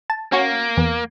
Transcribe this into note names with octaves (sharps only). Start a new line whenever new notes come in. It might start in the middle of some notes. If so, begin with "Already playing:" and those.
A5
A#3 C#4 F#4
E2